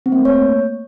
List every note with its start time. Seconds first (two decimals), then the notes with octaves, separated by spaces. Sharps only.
0.06 C4
0.12 A#3
0.19 A3
0.25 C#5